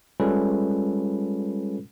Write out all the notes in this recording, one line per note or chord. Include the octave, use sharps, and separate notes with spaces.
G3 G#3 C#4 F4 A4 B4